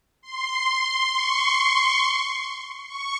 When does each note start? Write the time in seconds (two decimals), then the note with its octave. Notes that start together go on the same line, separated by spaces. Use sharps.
0.22 C6
1.11 C#6
2.87 C#6